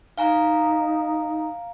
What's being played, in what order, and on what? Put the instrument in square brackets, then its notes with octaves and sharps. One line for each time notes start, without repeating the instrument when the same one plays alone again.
[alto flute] D#4 [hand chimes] F5 G#5 A#5